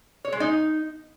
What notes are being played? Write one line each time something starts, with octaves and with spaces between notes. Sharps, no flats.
C#5
G#3
D#4